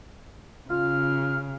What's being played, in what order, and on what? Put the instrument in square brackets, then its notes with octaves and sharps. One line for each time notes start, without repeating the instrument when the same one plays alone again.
[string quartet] C#3 [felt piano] F4 [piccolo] F6